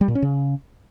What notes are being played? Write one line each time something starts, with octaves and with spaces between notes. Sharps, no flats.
G3
A#2
C#4
C#3